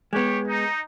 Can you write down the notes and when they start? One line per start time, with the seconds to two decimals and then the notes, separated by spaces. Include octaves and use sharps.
0.13 G#3 B3 G4 C#5
0.47 D#4